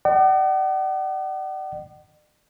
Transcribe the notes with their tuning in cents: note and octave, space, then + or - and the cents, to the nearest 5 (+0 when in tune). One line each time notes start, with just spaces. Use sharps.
D5 +45 F#5 +45